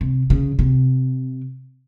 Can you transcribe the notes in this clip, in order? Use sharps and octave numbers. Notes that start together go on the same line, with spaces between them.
C3
C#3
C3